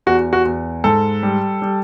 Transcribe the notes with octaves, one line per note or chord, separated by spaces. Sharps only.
E2 F#4
F#4
E2
G#2 A4
G3
G3